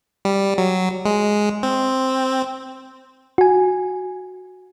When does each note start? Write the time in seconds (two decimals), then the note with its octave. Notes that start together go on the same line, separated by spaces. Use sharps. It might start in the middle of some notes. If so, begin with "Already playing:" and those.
0.25 G3
0.58 F#3
1.05 G#3
1.63 C4
3.38 F#4 G#5